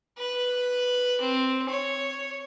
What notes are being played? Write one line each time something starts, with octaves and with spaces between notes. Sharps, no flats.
B4
C4
C#5